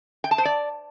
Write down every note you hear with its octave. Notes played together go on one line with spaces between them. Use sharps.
G5
A5
C5
D5